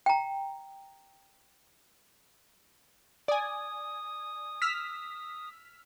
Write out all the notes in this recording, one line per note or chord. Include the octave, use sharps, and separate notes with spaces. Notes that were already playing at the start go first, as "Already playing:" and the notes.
G5 A#5
D5 G#5 D#6
E6 F6 B6